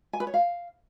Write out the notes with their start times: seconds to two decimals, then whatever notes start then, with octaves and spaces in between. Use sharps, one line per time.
0.13 G#5
0.20 B4
0.27 C#5
0.34 F5